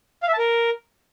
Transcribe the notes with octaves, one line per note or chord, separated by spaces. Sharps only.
F5
E5
A5
A#4